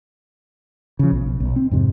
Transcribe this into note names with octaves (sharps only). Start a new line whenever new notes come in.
C#3 F3
B1
B1
B1
C4
F2 G#2 C3